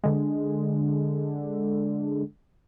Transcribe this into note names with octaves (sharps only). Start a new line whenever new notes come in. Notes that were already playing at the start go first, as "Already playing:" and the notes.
D3 G#3